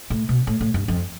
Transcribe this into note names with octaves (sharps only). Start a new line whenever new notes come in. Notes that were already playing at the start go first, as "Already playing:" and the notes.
A2
B2
A2
A2
G2
F2